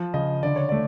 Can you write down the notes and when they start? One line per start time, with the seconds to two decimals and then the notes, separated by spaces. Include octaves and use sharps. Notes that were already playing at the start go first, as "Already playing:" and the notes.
Already playing: F3
0.14 C#3 D#5
0.43 D3 D5
0.56 C#5
0.69 A3 D5